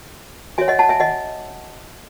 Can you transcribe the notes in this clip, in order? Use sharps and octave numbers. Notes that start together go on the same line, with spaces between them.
F#4 C#5 E5 G#5
D#5 F#5
F#5 A5
E5 G#5
D#5 F#5